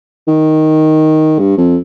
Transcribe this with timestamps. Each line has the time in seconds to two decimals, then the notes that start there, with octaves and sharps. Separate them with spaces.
0.28 D#3
1.39 G2
1.58 F2